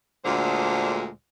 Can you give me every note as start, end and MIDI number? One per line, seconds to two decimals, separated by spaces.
0.24 1.09 38
0.24 1.09 46
0.24 1.09 50
0.24 1.09 56
0.24 1.09 72